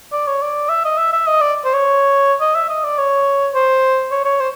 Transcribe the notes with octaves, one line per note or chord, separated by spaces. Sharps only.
D5
C#5
D5
E5
D#5
E5
E5
D#5
D5
C5
C#5
D#5
E5
D#5
D5
C#5
C5
C#5
C#5
C5